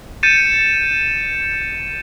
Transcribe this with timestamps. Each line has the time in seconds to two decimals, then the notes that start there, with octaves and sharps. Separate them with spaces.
0.23 G6 A6 C#7 D#7 E7